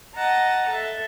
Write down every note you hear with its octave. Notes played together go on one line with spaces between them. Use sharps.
D#5 F#5 A5 A#5
A4 E5